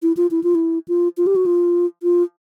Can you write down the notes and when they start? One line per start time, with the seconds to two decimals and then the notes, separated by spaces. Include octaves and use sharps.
0.03 E4
0.17 F4
0.31 E4
0.43 F4
0.55 E4
0.88 F4
1.17 F4
1.27 G4
1.36 F#4
1.46 F4
2.03 F4